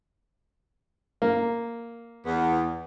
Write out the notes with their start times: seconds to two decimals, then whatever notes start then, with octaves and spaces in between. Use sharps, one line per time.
1.22 A#3
2.26 E2 B3